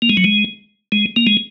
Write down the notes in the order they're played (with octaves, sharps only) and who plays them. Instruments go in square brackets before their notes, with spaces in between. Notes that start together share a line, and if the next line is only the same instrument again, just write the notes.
[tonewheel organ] A#3
G#3
F#3
G#3
G#3
A#3
G#3